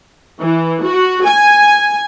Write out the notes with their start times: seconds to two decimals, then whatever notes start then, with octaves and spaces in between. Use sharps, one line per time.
0.40 E3
0.83 F#4
1.24 G#5